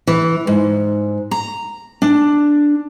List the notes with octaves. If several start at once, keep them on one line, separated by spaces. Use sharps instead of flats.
E3
G#2
A#5
D4